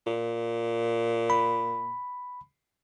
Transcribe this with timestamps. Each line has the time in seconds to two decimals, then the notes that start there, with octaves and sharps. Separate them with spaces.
0.07 A#2
1.30 B5